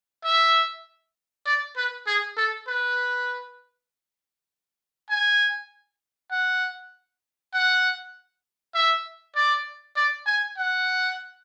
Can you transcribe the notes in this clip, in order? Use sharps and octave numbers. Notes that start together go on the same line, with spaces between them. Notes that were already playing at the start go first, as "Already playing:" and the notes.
E5
D5
B4
G#4
A4
B4
G#5
F#5
F#5
E5
D5
D5
G#5
F#5